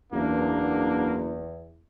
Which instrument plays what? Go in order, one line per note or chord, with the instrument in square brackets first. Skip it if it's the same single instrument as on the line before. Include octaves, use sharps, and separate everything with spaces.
[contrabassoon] F#1 [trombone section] E2 [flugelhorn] A#3 [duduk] D4